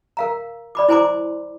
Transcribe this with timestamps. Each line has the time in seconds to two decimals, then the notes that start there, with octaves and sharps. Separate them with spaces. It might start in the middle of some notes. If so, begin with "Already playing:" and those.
0.17 A#4 F5 A#5
0.75 D5 B5 D6
0.89 E4 C5 G#5 A#5 C6 D6